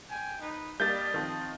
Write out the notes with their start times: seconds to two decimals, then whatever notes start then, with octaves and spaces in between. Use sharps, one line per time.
0.10 G5 G#5
0.41 D#4 B4
0.80 G3 A#3 D4 G4 D#5 G6 A6
1.14 D#3 F3 C4